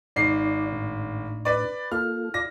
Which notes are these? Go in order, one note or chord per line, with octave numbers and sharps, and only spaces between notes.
G#1 D#4 D5 C7
A2 D4
B4 D5
A#3 F4 A4 F6
F4 D5 A#6